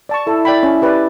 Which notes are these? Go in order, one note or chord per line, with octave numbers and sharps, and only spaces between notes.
D5 A5 C#6
E4 A4
D5 G5 B5
C#4
G4 B4 D5